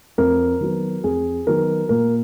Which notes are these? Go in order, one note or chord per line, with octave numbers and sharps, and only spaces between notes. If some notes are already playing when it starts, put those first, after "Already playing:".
F2 A#4
D#3 F#3 B3
F2 G#4
D#3 F#3 B3 A#4
A#2 A#4